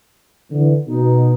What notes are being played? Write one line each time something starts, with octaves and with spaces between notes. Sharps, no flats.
D3 E3
B2 D#4